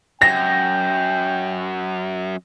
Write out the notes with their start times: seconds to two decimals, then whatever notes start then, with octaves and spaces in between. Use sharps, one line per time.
0.22 F#2 G5 A#6